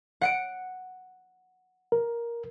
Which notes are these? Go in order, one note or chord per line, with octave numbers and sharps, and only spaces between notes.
F#5 C#7 D7
A#4